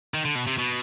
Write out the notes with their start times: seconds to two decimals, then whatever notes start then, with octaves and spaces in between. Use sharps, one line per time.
0.14 D#3
0.25 D3
0.35 B2
0.47 C3
0.58 B2